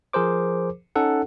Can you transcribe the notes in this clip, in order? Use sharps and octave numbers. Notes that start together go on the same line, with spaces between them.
F3 G#4 A#4 C5 D6
C#4 D#4 A4 F#5